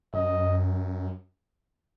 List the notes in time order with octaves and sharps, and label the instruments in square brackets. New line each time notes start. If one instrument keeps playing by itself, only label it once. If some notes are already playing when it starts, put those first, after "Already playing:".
[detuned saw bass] F#2 [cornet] D#5